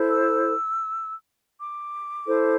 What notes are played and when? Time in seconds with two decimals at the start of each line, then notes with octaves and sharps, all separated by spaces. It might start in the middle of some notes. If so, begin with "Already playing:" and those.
Already playing: E4 A4 C5
0.09 E6
1.59 D6
2.26 E4 A4 C5